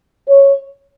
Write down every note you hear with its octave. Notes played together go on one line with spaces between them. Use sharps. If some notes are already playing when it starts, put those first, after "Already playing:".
C#5